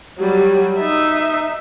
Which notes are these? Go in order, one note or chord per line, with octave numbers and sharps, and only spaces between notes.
F#3 G3
D#4 E5